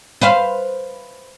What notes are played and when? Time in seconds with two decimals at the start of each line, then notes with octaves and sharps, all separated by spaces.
0.21 B4 C5 F5